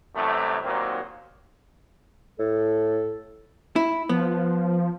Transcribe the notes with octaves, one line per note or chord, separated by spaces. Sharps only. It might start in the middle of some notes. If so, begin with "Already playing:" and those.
C2 F#2 C3 E3 A3
D#2 A#2 D#3 F#3 A#3 C4
A2 A4
E4
F3 B3